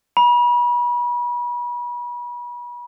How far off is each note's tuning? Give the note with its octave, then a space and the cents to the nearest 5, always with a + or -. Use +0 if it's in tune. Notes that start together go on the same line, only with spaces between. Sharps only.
B5 -35